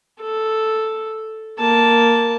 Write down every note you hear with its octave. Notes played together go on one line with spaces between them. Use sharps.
A4
A#3 A5